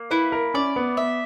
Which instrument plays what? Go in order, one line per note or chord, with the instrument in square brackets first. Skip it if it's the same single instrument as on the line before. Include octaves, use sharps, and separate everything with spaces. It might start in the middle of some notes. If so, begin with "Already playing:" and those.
Already playing: [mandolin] A#3
[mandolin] E4 [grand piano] B4
[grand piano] A#4
[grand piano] C#4 [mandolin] D5
[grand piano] B3
[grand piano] B3 [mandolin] E5